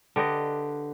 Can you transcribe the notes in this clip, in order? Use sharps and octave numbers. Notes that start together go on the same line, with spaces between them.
D3 G4 B4 D#5